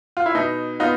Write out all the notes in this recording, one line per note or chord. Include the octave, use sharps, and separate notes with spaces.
F4
E4
B2 D#4
B3 D#4 F4